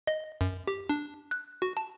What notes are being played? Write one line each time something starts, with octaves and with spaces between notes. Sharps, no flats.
D#5
F#2
G4
D4
F#6
F#4
A5